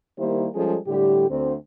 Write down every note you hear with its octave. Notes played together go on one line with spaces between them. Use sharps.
D#3 G3 A#3 E4 G4 C5
F3 G3 G#3 C#4 G#4 A4
A2 D3 G3 G4
D2 C4